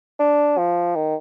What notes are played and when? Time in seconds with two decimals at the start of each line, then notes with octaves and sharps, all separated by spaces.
0.20 D4
0.58 F3
0.96 D#3